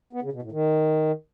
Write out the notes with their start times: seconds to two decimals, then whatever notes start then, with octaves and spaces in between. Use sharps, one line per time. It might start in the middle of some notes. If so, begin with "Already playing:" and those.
0.13 B3
0.23 C#3
0.33 B2
0.42 A2
0.52 D#3